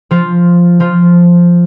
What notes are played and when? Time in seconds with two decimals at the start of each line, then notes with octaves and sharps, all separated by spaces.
0.11 F3 F4
0.80 F3 F4